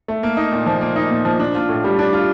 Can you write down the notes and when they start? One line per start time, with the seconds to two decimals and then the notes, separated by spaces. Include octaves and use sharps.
0.08 A3
0.23 A#3
0.37 D#4
0.52 A#2
0.67 F3
0.81 A#3
0.96 D#4
1.11 A#2
1.25 F3
1.40 D4
1.55 F4
1.69 A2
1.84 G3
1.99 D4
2.13 F4